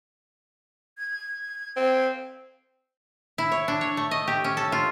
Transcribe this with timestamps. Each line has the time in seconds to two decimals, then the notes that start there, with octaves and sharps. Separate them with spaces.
0.98 G#6
1.76 C4
3.38 E4
3.52 C#5
3.68 D4
3.81 C#5
3.97 A3
4.11 D#5
4.27 G4
4.44 C#4
4.57 A4
4.72 F4